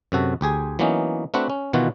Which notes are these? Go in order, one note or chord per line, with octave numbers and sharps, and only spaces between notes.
F#2 C3 F#4 A4
D2 G4 G#4 G#5
E3 F#3 A#3 B3 C#4 D#4
A3 C4 D4 F#4 B4 F#5
C#4
B2 D#3 E3 B3 F4 F#4